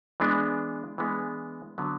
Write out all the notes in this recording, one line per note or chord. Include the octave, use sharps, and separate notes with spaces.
E3 G#3 B3 D4
E3 G#3 B3 D4
D3 F#3 B3